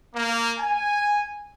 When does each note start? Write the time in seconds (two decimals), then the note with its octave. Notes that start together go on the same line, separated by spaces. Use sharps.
0.16 A#3
0.59 G#5